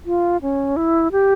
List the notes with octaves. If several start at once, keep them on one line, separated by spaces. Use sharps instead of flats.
F4
C#4
E4
G4